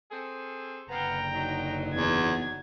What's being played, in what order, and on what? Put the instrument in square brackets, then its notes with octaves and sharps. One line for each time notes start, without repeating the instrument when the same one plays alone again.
[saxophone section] C4 G#4 A4
[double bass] F#1 D3 [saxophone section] B3 F5 [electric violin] G5 A#5
[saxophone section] F#3 D#4
[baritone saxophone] E2 [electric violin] G#6